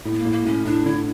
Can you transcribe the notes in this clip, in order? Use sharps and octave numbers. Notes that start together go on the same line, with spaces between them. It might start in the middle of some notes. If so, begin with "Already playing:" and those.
A2 A3
B3
A#3
A2
A#3
A2 C#4
A2 D4
D3 E4